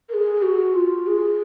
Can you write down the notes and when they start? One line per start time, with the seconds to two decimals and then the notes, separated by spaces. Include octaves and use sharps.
0.09 A#4
0.13 G#4
0.42 F#4
0.74 F4
1.06 G#4